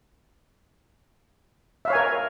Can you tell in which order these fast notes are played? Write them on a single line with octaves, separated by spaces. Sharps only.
E5 F5 C#5 G#5 A#4